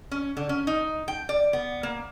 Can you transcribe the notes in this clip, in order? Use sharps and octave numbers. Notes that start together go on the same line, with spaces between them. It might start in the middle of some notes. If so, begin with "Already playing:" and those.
C#4
D3
C#4
D#4
G5
D5
B3
A#3